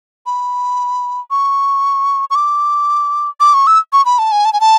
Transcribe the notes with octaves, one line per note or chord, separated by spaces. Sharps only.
B5
C#6
C#6
D6
D6
C#6
E6
C#6
B5
A5
G#5
A5
G#5
A5